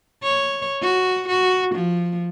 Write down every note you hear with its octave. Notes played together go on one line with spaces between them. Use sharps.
C#5
F#4
F#4
F3